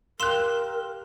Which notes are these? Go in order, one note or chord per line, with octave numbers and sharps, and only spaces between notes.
G4 A#4 F5 C6 E6 F#6 E7